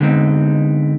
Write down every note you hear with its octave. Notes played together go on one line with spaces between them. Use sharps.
D3 G#3 B3 C4 D#4